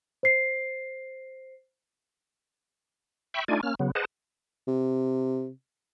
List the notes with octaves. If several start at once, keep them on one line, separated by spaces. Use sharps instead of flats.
C5 C7
E5 G5 B5 C#6
A3 D4 D#4 F4 D5 G#5
A#3 C#4 F6
C#3 F#3 B3
G#4 B4 C5 D#5 F#5 A5
C3